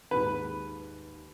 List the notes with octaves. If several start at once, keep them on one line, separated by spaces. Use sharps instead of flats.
D#2 G#2 B4